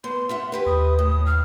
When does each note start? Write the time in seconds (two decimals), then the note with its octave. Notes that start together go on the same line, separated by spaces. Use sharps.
0.04 B3 C6
0.29 F4 E5 F#5
0.52 E4 G4 B4
0.66 D#2 D#6
0.99 A2
1.26 F6